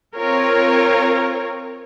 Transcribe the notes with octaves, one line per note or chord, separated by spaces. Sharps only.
C4 F4 A#4 C#5